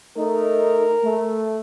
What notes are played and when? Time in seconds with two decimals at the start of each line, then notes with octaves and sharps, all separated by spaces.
0.17 A3 D#4 A#4
1.03 A3